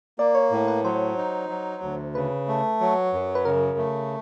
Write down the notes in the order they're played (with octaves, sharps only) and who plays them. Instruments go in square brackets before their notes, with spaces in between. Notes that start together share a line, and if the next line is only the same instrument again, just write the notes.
[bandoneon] A#3 [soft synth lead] D5
[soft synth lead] C#5
[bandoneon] A2
[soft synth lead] B4
[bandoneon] F#3 [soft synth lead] C5
[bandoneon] D#4
F#3
D2
[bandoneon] C#3 [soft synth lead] B4
[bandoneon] A3
F#3
F#2
[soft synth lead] B4
[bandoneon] C#3 [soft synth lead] A#4
[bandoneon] A3